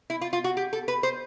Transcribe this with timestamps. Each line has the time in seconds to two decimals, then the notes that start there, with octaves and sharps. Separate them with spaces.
0.10 E4
0.21 F4
0.33 F4
0.44 F#4
0.57 G4
0.73 A4
0.88 B4
1.03 C5